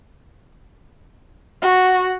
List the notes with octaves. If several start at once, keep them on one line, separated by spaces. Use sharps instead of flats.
F#4